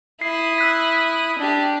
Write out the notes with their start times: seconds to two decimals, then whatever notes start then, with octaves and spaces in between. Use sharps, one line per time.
0.21 E4 D#6 C7
0.58 E6 F#6 B6
1.38 D4 G4